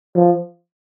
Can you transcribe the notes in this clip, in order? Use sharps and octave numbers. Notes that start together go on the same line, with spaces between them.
F3